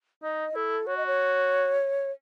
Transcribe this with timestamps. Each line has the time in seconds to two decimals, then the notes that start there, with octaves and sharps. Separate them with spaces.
0.23 D#4 D#5
0.55 E4 A4
0.87 F#4 C#5
0.97 D#5
1.06 C#5